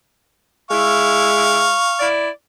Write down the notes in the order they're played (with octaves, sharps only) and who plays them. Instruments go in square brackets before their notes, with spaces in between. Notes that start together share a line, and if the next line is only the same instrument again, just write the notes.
[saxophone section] G#3 E4 [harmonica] F5 C#6
[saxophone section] E4 D5